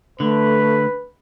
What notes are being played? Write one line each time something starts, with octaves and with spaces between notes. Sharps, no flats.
D3 A3 B4